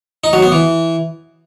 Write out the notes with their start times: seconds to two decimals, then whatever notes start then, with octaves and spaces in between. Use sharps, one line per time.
0.24 D#4
0.33 F#3
0.43 B3
0.52 E3